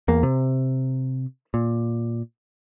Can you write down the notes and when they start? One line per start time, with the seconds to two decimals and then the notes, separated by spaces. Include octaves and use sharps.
0.08 E2 A#3
0.23 C3
1.54 A#2